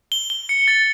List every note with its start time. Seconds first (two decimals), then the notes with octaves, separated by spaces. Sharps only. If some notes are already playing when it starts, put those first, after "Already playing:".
0.12 G7
0.30 G7
0.49 C#7
0.68 A6